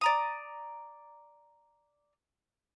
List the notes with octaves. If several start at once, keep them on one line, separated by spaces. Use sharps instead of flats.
D5 A#5 D#6